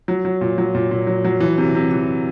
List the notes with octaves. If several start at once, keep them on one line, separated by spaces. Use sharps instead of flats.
F#3
F#3
A#2
F#3
A#2
A#2
F#3
F#3
E3
C3
C3
E3